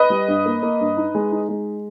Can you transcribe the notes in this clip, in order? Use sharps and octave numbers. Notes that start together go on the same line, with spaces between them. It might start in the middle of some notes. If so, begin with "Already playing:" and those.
Already playing: B4 D#5
G3
G2
A#3
A#3
G2
D#4
G#3
D#4
G#3